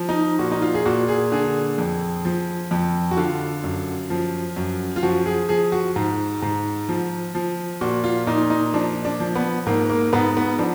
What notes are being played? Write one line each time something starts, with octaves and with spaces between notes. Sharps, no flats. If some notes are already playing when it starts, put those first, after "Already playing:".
Already playing: F3
D#4
A#2 F#4
D#4
F4
G#4
A#2 F#4
G#4
D3 G#4
F2
F3
F2
F#4
D3 F4
F#2
F3
F#2
F4
F3 F#4
G#4
F3 G#4
F#4
G#2
G#2
F3
F3
A#2 F#4
F4
A#2 D#4
D#4
F3 D4
D4
F3
B3
G#2 A#3
A#3
G#2 B3
B3
F3 D4